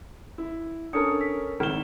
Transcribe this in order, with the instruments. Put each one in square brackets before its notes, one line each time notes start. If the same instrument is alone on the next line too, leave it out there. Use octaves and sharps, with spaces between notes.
[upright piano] E4
[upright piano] C#4 A4 A#4 [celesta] D4 D#6 C#7
[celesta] E6 B6
[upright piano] G#1 G7 [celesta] F6 E7